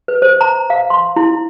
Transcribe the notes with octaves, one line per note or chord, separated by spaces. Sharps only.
B4
C5
A#5
F5
C6
E4